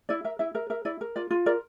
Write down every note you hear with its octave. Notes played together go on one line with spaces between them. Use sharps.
E4 D5
A#4 E5
E4 E5
A#4 E5
A#4 E5
E4 D5
A#4
F4 D5
F4
A#4 D5